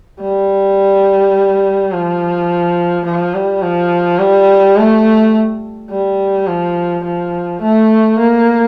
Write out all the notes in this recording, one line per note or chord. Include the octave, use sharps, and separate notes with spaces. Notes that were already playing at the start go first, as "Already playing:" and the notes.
G3
F3
F3
G3
F3
G3
A3
G3
F3
F3
A3
A#3